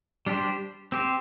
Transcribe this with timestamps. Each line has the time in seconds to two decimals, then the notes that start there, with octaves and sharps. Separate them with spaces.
0.26 G3 D4 G4 C5
0.92 C4 G4 C5